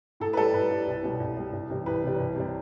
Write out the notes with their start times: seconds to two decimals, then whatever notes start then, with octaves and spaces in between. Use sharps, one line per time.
0.20 A2 A4
0.33 B4
0.37 G3 A4
0.53 A2 B4
0.71 G3
0.87 C2
1.03 B2 G3
1.20 C2
1.37 B2 G3
1.53 C2
1.70 C3 E3 G3
1.86 C2 B4
2.03 C3 E3 G3
2.20 C2
2.36 C3 G3